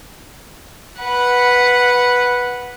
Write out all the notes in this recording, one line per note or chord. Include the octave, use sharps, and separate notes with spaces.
B4 F#5